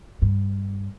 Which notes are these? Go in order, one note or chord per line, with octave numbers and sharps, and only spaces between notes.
G2